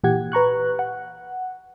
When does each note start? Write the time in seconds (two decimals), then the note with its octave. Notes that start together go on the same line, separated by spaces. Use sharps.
0.03 A#2 E3 G4 F#5 G#6
0.32 B4 A#5 C#6 F#6
0.79 F#5